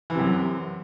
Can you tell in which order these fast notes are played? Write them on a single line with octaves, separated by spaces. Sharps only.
E3 C3 F#2